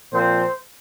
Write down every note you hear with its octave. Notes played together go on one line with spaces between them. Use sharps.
A#2 F3 C4 C5